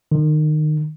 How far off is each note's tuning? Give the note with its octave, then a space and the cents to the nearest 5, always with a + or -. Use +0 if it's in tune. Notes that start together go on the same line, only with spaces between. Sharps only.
D#3 -25